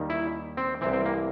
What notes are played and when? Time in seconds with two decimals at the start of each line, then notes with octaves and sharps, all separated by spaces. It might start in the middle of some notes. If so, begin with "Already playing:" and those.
Already playing: D#2 D#3 G3
0.10 E4
0.57 C4
0.81 C2 C3 E3 C4
0.93 C4
1.05 A#3